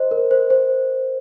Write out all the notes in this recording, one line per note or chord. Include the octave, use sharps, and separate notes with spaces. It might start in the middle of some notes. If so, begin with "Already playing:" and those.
Already playing: C5 D#5
A#4
C5
C5